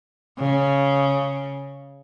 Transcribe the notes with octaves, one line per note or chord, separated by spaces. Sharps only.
C#3